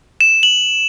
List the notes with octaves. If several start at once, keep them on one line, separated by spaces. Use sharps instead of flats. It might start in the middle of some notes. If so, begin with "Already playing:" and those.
E7
F#7